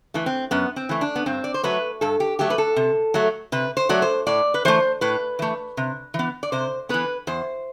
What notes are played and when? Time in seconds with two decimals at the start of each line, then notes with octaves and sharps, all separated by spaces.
0.14 E3 A3
0.26 C4
0.51 F#2 B3
0.76 C4
0.89 E3 A3
1.01 D4
1.15 B3
1.26 G2 C4
1.44 D5
1.54 C5
1.63 F#3 A3 B4
2.01 G2 A4
2.20 G4
2.39 F#3 A3 G4
2.50 B4
2.58 A4
2.76 C3
3.14 F#3 A3
3.52 C3 B4
3.77 C5
3.89 F#3 A3 D5
4.02 C5
4.27 A2 D5
4.54 B4
4.65 E3 A3 C5
5.01 A2 B4
5.39 E3 A3
5.77 C3
6.14 E3
6.19 B3
6.43 D5
6.52 C3 C5
6.89 E3 B3 B4
7.27 E2 C5